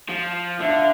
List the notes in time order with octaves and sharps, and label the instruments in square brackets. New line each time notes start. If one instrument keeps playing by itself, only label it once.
[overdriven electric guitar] F3
[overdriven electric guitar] D3 [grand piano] E5
[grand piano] F5
E5